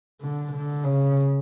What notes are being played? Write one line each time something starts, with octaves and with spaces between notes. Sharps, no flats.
D3
D3
C#3